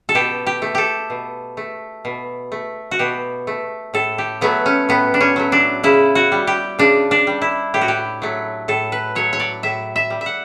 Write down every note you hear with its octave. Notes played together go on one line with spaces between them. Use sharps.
A4
B2 G4
G4
A3
G4 A4
B2
A3
B2
A3
F#4
B2 G4
A3
A2 A4
G4
F#3 A3 B3
C#4
A2 B3
D4
C#4
F#3 A3
D4
C#3 E4
F#4
G3
G4
C#3 D4
D4
G3
E4
A2 G4
F#4
G4
F#3 A3
A2 A4
B4
F#3 A3 C#5
C#5
D5
A2 E5
E5
G3
E5
F#5